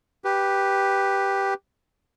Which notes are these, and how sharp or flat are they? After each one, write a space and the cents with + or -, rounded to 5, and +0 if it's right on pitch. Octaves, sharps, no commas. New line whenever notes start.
G4 +0 B4 +0